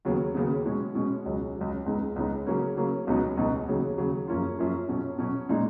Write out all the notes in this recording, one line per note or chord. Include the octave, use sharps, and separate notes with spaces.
D#2 C#3 F#3 B3
D#2 C#3 F#3 B3
B2 G#3 C#4
B2 G#3 C#4
C#2 C#3 F#3
C#2 C#3 F#3
C#2 C#3 G#3 B3 D#4
C#2 C#3 G#3 B3 D#4
C#3 F#3 A#3 C#4
C#3 F#3 A#3 C#4
C#2 B2 F#3 B3 D#4
C#2 B2 F#3 B3 D#4
D#2 C#3 F#3
D#2 C#3 F#3
F#2 F3 A#3 C#4 F4
F#2 F3 A#3 C#4 F4
B2 F#3 C#4
B2 F#3 C#4
A#2 G#3 D#4